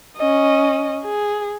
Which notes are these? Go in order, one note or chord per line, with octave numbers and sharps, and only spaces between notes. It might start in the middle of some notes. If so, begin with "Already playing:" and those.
C#4 D#5
G#4